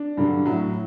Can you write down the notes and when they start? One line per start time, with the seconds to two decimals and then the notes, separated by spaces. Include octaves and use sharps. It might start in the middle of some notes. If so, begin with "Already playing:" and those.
Already playing: D4
0.17 G2 D3 F#3
0.46 A2 F#3